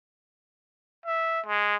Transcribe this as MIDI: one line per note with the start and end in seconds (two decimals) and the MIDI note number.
1.06 1.41 76
1.46 1.76 56